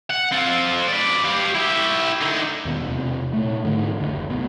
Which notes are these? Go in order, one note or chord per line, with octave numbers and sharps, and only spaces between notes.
F#5
C4 F4
B4 D5
G4 F5
E4 G4
D3 D#4
D#2 B2
E1 C3
A#2 A3
G#2 D3 E3
F#1 D2
C2 B2